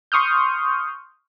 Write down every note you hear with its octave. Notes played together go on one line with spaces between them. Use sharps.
C6 C#6 D#6 F6 G6